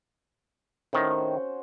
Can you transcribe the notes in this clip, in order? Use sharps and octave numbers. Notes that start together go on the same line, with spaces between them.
A2 D#3 C#4 F#4 C5